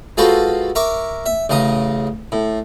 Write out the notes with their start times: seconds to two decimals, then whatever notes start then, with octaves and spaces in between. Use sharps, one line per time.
0.17 G#3 F4 F#4 A4 B4 C5
0.75 A#4 E5 C#6 D6
1.26 E5
1.49 A1 C#3 D#5 A#5 D#6
2.32 A2